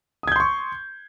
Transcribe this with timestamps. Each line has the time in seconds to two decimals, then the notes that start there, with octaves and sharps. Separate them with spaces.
0.23 D#6
0.28 G#6
0.32 G6
0.36 C6
0.40 C#6